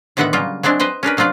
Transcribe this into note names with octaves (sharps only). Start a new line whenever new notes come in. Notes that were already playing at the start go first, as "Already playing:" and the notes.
A2 D3 D#3 B3 E5 F#5
C#3 F#3 G3 A#3 F4
F#3 G#3 C4 D4 E4
B4 C5 D#5 G5
C#4 D4 A#4 B4
C3 F#3 D4 F4 D5